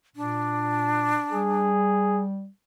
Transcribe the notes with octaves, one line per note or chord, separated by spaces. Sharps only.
A#2 D4
G3 G#4